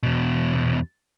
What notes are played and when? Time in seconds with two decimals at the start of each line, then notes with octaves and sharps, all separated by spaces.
0.03 E2 B2